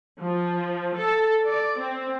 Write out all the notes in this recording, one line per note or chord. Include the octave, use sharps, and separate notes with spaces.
F3
A4
D5
C4